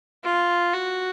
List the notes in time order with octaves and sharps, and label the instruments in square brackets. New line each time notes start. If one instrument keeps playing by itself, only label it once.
[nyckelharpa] F4
F#4